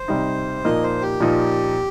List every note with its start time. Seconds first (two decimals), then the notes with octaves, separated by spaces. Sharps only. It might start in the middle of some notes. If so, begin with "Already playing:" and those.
Already playing: C5
0.08 C3 G3 D#4
0.64 A#2 F3 A#3 D#4 D#5
0.83 C5
1.02 G4
1.20 A#2 F3 A#3 D#4